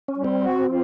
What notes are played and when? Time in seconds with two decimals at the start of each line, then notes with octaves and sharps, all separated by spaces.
0.08 C#4
0.17 G3
0.24 C4
0.42 F#4
0.67 F3